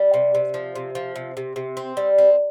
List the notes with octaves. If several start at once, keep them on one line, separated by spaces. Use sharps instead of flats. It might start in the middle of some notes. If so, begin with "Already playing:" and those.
Already playing: G3
C3
C3
F3
C3
F3
C3
C3
C3
C4
G3
C4